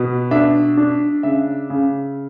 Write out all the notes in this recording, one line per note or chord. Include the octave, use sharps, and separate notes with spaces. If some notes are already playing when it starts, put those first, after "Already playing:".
Already playing: B2 B3
D4 E5
D4
C#3 E5
C#3